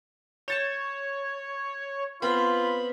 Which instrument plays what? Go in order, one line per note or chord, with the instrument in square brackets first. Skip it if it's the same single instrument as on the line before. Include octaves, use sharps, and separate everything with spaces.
[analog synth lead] C#5 [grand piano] G6 A6 E7
[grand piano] B3 C4 [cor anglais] F4 [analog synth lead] B5